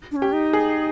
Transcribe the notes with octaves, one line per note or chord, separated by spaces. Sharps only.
D4
C#4
G4
D#4
G#4